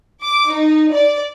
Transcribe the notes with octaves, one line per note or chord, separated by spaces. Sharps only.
D6
D#4
D5